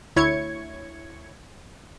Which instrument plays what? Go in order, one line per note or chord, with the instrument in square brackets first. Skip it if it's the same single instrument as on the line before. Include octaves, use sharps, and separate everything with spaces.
[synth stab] D2 E4 C#5 G#6 C#7